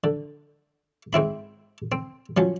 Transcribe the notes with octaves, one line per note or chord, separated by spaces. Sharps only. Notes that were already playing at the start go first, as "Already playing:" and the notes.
D3
G#2 C4 E4 B5
C4
F3 F#3 C#4